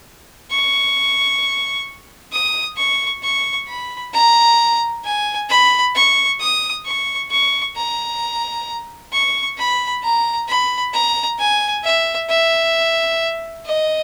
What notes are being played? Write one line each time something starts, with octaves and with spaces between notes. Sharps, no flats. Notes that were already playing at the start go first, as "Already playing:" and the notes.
C#6
D#6
C#6
C#6
B5
A#5
G#5
B5
C#6
D#6
C#6
C#6
A#5
C#6
B5
A#5
B5
A#5
G#5
E5
E5
D#5